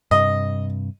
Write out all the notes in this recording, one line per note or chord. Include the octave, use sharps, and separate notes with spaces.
G2 C3 D#5